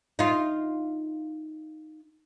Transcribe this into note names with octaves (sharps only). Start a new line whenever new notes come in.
D#4 F4